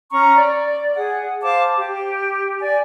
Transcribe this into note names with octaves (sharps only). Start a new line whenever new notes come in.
C#4 A#5 C#6
D5
G#4 F#5
C5 F5 A5 D6
G4
D5 G#5